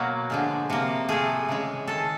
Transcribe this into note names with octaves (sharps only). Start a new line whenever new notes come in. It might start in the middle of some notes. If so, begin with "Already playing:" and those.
Already playing: B2 F#3 A#3
D3 F3 G#3
C3 F3 A#3
C3 F3 A3 G#4
C#3 E3 G#3
D#3 G#3 A4